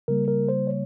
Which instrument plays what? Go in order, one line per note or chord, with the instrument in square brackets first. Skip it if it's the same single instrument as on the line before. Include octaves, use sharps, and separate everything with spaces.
[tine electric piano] C#3 G3 A#3 A#4
A#4
C5
C#5